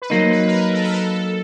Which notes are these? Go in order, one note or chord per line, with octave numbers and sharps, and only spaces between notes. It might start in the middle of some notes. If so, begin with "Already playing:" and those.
B4
F#3 A#3 D#4 C5
B4
A#4
B4
A4
A#4
A4